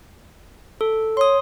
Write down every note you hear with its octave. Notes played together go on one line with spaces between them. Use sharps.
A4
C#5 C6 D#6